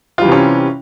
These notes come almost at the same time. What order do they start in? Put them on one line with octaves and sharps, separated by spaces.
F4 G3 E3 C3 C#4